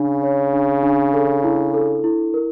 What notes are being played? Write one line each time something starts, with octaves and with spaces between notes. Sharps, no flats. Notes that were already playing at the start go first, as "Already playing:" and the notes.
Already playing: C#3 D4
C#5
D4
D4
A4
E4
A4
E4
A#4